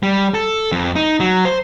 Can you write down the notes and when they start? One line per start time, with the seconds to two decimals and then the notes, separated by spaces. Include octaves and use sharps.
0.03 G3
0.34 A4
0.72 F2
0.96 D#4
1.20 F#3
1.45 C5